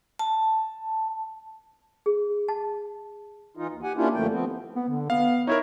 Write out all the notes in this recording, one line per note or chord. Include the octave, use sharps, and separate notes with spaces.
A5
G#4
A5
E3 D#4 F4
D#2
G4 F#5 G#5
A#3 C#4 D4 E4 F4 G4
F#2 D3 F3 A3 A#3 G5
F3 B3 C4
B3
D3
B3 F5
D#4 E4 A#4 C#5